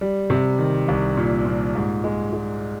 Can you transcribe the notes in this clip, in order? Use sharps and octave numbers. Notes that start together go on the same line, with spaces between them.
G3
C3
D#3
C2
A#2
A#2
G#2
G#3
G#3